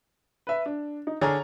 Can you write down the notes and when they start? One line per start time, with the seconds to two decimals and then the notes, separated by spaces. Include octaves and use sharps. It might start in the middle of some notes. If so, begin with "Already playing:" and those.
0.47 B4 E5
0.66 D4
1.07 D#4
1.21 D3 G#4 C#5 A#5 F6